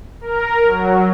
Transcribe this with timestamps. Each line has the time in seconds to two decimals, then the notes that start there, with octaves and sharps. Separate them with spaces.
0.21 A#4
0.65 F#3